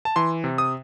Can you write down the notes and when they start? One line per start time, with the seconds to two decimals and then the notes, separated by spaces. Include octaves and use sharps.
0.05 A5
0.16 E3 C6
0.44 C3
0.58 D#6